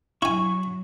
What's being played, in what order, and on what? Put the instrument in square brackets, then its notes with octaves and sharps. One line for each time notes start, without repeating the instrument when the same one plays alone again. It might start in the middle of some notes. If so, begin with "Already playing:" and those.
[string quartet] F#3 [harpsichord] E4 G#5 [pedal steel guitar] C#6